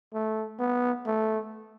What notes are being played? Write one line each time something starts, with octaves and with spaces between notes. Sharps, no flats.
A3
B3
A3